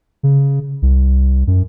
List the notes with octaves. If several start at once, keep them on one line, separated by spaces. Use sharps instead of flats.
C#3
C2
F#2